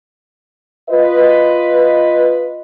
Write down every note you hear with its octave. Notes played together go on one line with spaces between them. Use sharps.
F4 B4 D#5